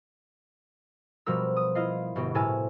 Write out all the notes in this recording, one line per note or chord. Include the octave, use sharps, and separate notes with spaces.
B2 F3 G3 A#4 E6
D#6
E4 F4 D#5 F5
G1 B2 B3 F#4 G4
A2 C3 A4 A#4 G#5 E6